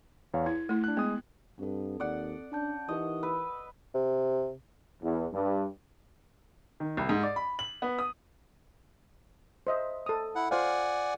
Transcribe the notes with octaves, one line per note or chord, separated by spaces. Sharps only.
E2 C#5 F5
E4 G#6
A3 E4
D4 F#6
G#3 B3 D#6
G2 C4 A4
D#2 D5 F#5
C#4 D4 A5 G6
E3 D#4 G4 A#4 D#5
B4 B5 E6
C3
E2
G2
D#3
C2
G#2
D5
B5
F#7
B3
D#6
C5 D#5 E5
A4 D#6
E4 F#5
F4 C5 D5 F5 F#5 G#5